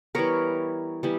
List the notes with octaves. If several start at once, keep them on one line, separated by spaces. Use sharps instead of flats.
E3 G3 B3 A#4 C#5
E3 G3 B3